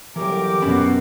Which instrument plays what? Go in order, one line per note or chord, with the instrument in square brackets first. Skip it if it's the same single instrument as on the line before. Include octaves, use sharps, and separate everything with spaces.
[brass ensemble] G1 G4 [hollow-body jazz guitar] E3 F#3 [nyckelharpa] A#4 D6
[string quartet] F#2 B2 [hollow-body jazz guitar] C#4 B5